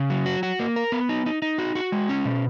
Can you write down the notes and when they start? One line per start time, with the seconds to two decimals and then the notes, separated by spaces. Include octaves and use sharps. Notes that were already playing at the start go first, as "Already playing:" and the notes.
Already playing: C#3
0.10 F#3
0.26 F#4
0.43 F#4
0.59 A#3
0.76 A#4
0.92 B3
1.09 D#4
1.26 D#4
1.42 D#4
1.58 F#4
1.75 F#4
1.92 G#3
2.09 C#4
2.25 B2